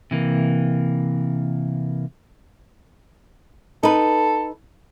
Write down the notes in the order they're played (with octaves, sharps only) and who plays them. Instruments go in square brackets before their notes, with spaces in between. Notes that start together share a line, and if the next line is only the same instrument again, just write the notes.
[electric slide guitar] C3 E3 A#3
[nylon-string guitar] D#4 B4 [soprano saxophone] A4